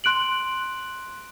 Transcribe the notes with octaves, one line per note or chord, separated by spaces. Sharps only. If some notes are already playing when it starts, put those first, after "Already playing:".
C6 F#6 D7 F#7